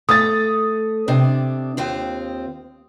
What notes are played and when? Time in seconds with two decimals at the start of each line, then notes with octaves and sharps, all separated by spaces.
0.09 A3 D#6 A6
1.08 C3 D4
1.77 D#2 C4 F4